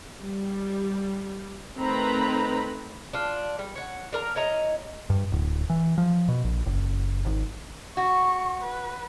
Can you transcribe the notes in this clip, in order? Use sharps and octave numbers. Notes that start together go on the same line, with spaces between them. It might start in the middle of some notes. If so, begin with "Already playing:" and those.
G3
D#3 A3 C4 B4 A#5 B5
D4 F4
G3
C#5 F#5
D4 A#4 A#5
E4 C#5 D#5 A#5
G2
D1
E3
F3
B2
A#1
F#1
G#1
F#4 C#6
B4